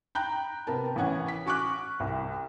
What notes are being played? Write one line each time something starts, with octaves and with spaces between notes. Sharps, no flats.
G5 A#5 B5 F#6 G6
C3 B3 A#4 A5
A1 E3 C#4 F#5 G#6
B6
F#4 G#5 C#6 D6 F6 F#6
C2